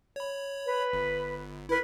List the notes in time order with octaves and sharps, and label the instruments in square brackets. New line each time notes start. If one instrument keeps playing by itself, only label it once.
[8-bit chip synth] C#5 B5
[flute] B4
[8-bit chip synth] G1
[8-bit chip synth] E4 A#4 [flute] B4